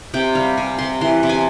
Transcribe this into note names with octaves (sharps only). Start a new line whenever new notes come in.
C3 G5
G3 F5
C3 G#5
C3 C6
E3 C6
C3
G#5